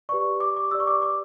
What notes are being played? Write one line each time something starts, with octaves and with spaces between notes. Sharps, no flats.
G4 B4 D5 C#6
D6
D6
G4 D5 E6
C#6
D6
D6